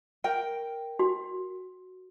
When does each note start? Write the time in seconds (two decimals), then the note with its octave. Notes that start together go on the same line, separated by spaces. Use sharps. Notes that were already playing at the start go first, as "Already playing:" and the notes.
0.24 A#4 G5
0.99 F#4